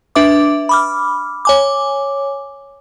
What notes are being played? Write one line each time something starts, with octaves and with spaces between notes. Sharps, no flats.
D4 B4 E5 D6
B5 D6 F6
C#5 G#5 D6